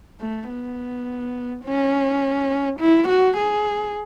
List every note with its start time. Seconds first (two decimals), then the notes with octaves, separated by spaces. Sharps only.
0.20 A3
0.49 B3
1.65 C#4
2.80 E4
3.08 F#4
3.38 G#4